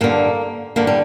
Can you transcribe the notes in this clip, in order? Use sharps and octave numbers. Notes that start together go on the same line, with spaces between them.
G2 D3 A#3
G2 D3 A#3
G3